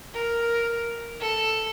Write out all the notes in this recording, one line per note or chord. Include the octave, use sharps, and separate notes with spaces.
A#4
A4